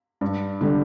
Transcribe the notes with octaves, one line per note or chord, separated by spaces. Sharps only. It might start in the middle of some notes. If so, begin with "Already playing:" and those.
G2
D3 G3